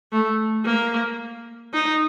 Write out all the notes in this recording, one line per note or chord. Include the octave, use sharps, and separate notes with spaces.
A3
A#3
D#4